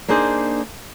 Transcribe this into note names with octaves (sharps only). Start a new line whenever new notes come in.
A#3 D4 D#4 G#4 C5